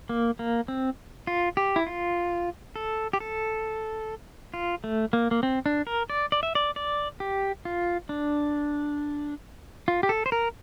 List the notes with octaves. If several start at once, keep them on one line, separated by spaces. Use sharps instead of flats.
A#3
A#3
C4
F4
G4
E4
F4
A4
G4
A4
F4
A3
A#3
A#3
C4
D4
A#4
D5
D5
E5
D5
D5
G4
F4
D4
F4
G4
A4
C5
A#4